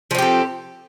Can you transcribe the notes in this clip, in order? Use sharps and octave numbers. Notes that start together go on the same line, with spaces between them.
F3 C4 G4 A4